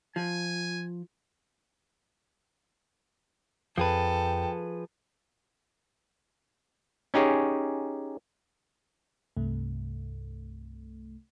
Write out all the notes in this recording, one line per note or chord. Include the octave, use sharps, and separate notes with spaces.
F3 G#5
F2 F3 G#4 A4 B4 G5
C#4 D#4 G4 G#4 C#5
C2 G2 C3 A3